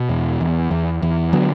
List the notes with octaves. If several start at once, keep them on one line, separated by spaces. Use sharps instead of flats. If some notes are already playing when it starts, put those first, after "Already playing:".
Already playing: B2
E2
E2
E2
E2
D3 F#3 B3